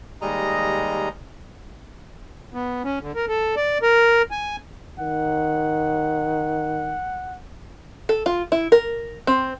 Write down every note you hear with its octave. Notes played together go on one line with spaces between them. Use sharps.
D#2 G3 G#3 D#5 A#5
B3
C#4
D3
A#4
A4
D5
A#4
G#5
D#3 F#5
A4
F4
E4
A#4
C4